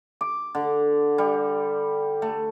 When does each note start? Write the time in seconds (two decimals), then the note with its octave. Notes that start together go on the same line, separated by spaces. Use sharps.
0.21 D6
0.55 D3
1.18 G3
2.22 A3